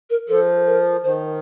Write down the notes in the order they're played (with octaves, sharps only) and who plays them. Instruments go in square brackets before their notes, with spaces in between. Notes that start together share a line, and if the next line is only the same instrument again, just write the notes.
[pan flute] A#4
[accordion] F3 [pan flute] A4
[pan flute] A#4
[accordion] D#3 [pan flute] C5